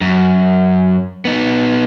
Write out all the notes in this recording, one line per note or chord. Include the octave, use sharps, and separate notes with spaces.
F#2
B3 D#4